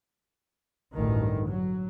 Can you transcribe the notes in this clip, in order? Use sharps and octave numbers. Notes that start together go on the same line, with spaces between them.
A1 D2 G2 D#3
F#3